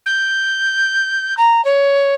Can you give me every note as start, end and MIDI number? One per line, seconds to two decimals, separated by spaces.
0.06 1.34 91
1.37 1.64 82
1.64 2.15 73